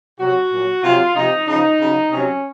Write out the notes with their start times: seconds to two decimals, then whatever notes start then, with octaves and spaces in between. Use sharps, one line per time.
0.20 C3 F#3 F#4
0.52 A#2 F#3
0.84 C3 F#3 F4
1.16 C3 F3 D#4
1.47 C#3 F3 D#4
1.80 C#3 F#3
2.11 C3 F#3 C#4